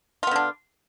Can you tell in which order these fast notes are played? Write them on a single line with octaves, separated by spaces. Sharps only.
F4 B3 D3 D4